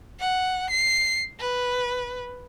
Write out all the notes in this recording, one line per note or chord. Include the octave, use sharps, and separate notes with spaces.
F#5
C7
B4